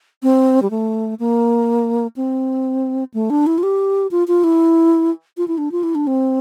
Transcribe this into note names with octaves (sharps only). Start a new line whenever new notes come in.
C4
G3
A3
A#3
C4
A3
D4
E4
F4
G4
F4
F4
E4
F4
E4
D4
F4
E4
D4
C4